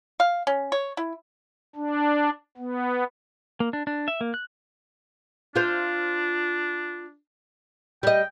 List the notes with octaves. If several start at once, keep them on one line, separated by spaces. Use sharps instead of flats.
F5
C#4
C#5
E4
D4
B3
A#3
D4
D4
E5
A#3
F#6
D4 F4 C5
G3 D#5 G5